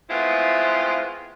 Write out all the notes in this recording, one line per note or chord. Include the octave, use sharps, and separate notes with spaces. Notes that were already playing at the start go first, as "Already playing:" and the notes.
G#3 A3 B3 C4 E4 F4